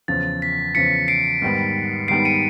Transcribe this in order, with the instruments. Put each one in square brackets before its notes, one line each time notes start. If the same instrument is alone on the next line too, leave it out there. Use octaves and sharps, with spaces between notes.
[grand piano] E2 C#3 F3 [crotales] A6
[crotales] B6
[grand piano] E2 C#3 F3 [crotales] B6 C#7
[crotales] C7 D7
[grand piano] G#2 D#3 G3 B3
[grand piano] G#2 D#3 G3 B3 [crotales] C7 D7
[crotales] C#7 D#7